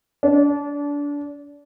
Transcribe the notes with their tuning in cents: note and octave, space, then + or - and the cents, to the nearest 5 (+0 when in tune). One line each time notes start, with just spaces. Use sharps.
D4 -25